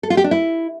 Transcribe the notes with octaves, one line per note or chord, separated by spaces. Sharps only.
A4
F4
G4
D4
E4